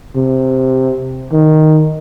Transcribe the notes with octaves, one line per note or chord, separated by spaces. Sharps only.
C3
D#3